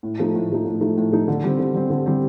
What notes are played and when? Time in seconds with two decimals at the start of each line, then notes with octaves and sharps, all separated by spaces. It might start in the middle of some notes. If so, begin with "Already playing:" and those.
0.03 A2
0.19 F3 A3 D#4
0.35 A2
0.50 F3 A3 D#4
0.65 A2
0.81 F3 A3 D#4
0.97 A2
1.12 F3 A3 D#4
1.28 D3
1.44 G3 C4
1.59 D3
1.75 G3 C4
1.90 D3
2.06 G3 C4